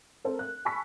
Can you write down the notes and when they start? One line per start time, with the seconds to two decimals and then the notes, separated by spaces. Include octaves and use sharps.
0.25 C4 A4 A#4
0.39 F#6
0.65 G#5 A5 B5 C#6 E6 B6